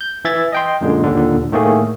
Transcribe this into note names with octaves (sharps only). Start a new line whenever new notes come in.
G6
E3 E5 G#6 A6
D#5 G5 C6
F#2 A#2 D3 G#3
D#2 A#2 D3
A2 D#3 A3 A#3 G#4